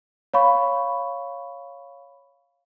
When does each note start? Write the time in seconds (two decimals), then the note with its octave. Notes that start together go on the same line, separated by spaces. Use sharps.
0.34 C#5 F5 B5 C#6